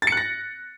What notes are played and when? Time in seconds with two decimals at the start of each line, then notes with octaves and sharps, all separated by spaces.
0.02 A6
0.07 C#7
0.12 F#6
0.17 A#6